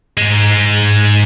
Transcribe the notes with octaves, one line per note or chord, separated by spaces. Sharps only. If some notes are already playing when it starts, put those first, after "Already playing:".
G#2 G#3